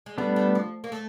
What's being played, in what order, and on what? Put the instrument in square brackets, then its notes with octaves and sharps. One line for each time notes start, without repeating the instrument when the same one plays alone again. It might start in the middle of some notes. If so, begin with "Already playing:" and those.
[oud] G#3
[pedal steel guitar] G3 B3 D4 [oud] A3
[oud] A3
F3
A#3
A3